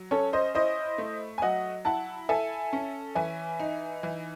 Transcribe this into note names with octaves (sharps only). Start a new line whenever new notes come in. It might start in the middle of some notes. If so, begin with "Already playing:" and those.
Already playing: F#3
C#4 A4 C#5
C5 D#5
E4 C5 D#5
A3
G#5
F#3 D#5 F#5
E4 F#5 A5
A4 E5 G#5
C#4
E3 E5 G#5
D#4
E3